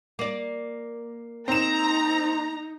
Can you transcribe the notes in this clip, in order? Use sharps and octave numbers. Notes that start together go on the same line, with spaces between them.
A#3 D5
C4 D#4 A#5 E7